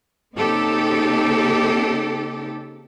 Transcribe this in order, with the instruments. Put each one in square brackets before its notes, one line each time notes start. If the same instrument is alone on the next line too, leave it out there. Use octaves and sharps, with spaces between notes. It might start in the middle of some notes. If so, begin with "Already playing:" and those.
[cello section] C#3 A#3 C4 D#4 G4 A4